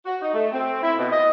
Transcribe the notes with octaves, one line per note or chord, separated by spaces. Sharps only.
F#4
D#4
A3
C4
E4
B2
D#5